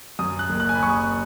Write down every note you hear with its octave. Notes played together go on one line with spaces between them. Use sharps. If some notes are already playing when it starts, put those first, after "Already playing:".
F#2 D#6
F#6
F#1
F#6
G#5
B5
F#1 C#6
D#6
F#6